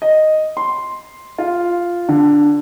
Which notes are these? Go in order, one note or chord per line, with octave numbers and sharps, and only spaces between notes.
D#5
C6
F4
D3